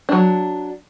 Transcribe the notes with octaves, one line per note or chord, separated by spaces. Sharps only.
F#3 D4